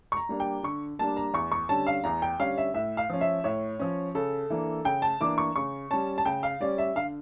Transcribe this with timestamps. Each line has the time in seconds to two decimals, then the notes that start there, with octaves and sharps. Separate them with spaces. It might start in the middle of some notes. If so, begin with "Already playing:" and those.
0.12 C#6
0.17 A#5
0.29 G3 A#3 D4
0.40 G5
0.63 D3 C#6
0.99 G3 A#3 D4 A5
1.17 A#5
1.33 E2 C#6
1.52 C#6
1.69 D3 G3 C#4 A5
1.87 F5
2.04 E2 A#5
2.22 G5
2.39 D3 G3 C#4 F5
2.58 E5
2.74 A2 E5
2.97 F5
3.10 F3 C#4
3.21 E5
3.44 A2 C#5
3.79 F3 C#4
4.15 C#3 A4
4.50 E3 A#3 D4
4.85 C#3 G5
5.02 A5
5.20 E3 A#3 D4 D6
5.38 C#6
5.56 C#3 C#6
5.91 G3 C#4 A5
6.18 A5
6.25 C#3 G5
6.43 F5
6.60 G3 C#4 D5
6.78 E5
6.96 D3 F5